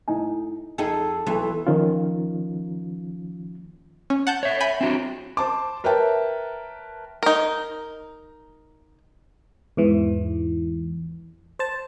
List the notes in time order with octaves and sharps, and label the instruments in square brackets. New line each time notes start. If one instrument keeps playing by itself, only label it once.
[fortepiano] A2 D#4 G#5
[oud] F2 G#4 A4 [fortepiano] D#4 G5
[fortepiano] B1 [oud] E3
[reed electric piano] D#3 F3 C#4 F4
[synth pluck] C#4
F#5 A5 G6
[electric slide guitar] C#5 E5
[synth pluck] G#5 B5 G6
[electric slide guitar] C4 D4 F#4
[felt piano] C5 A5 D6
A#4 B4 C#5 E5 G5 A5
[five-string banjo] D#4 A#4
[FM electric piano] E2 G#2 E3
C5 A5